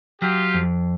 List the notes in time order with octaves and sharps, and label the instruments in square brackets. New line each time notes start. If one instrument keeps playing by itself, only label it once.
[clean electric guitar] F#3 [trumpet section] F4 G4
[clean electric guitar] F2